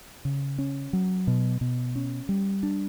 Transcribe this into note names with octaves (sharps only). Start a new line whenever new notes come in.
C#3
C#4
F#3
B2
B2
C#4
G3
D4